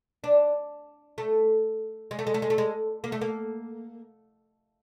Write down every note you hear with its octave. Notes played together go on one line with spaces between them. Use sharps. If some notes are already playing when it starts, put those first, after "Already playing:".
D4
A3
G#3
A3
G#3
A3
G#3
A3
G#3
A#3
A3
A#3